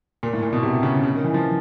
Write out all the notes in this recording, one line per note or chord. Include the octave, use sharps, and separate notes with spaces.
A#2
A2
A#2
B2
C3
C#3
C#3
D#3
E3
F3